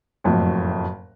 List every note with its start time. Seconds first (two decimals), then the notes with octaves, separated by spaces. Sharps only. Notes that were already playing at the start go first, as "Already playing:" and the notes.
0.24 F#1 F2 A2